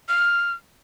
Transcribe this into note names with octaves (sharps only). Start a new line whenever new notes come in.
F6